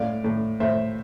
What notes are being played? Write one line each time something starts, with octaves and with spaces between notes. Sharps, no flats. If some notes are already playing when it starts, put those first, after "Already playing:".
Already playing: A2 D5 F5
A2
A2 C5 E5